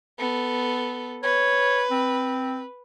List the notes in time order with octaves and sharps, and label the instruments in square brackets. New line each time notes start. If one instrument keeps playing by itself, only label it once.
[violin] B3 A4
[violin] B4 [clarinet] C#5
[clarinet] C4